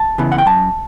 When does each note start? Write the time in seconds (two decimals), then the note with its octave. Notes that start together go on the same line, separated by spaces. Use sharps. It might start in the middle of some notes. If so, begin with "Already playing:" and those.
Already playing: A5
0.18 C#3 E3 B3
0.32 F#5
0.38 G5
0.46 F#2 A5